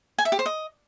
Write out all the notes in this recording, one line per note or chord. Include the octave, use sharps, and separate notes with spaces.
G#5
E5
G4
C5
D#5